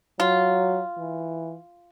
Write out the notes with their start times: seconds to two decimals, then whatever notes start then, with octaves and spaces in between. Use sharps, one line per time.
0.20 F#3 F4
0.98 E3